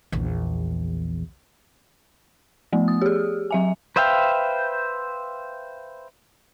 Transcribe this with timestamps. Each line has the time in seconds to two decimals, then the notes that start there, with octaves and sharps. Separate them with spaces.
0.12 A#1 E2
2.73 F3 A3 B3
2.88 D#6
3.01 G4 G#4
3.51 F#3 E5 G#5
3.96 B4 C5 E5 F5 G5